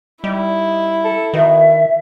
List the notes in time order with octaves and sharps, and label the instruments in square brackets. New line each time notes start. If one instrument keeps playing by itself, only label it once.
[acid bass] G3 [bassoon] D#4 [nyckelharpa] E4
[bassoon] A4
[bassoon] B2 [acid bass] D#3 [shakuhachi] E5